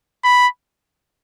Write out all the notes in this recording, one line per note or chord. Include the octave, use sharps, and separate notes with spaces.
B5